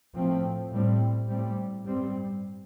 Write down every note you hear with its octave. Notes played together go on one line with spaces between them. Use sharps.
A2 F3 A3 C4
A2 G3 C4
A2 G3 C4
G2 G3 C4